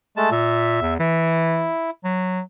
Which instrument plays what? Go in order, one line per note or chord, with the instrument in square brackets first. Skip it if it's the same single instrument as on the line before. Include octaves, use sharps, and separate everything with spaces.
[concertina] G#3 A3 A5
[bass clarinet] A#2 [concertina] E5
[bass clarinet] E2
[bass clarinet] E3 [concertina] E4
[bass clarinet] F#3